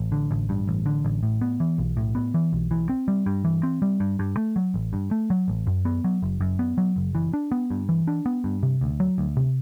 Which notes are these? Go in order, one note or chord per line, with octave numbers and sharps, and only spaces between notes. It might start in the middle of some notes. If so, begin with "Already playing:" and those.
Already playing: A1
D3
A1
G2
A1
D3
A1
A2
B3
E3
B1
A2
B3
E3
B1
E3
C4
G3
G2
E3
C4
G3
G2
G2
A3
F#3
A1
G2
A3
F#3
A1
F#2
B3
F#3
F#1
F#2
B3
F#3
F#1
E3
D4
B3
G2
E3
D4
B3
G2
C3
D2
F#3
D2
C3